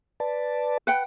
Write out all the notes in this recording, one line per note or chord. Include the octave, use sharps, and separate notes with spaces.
B4 D5 A5
B4 F#5 G5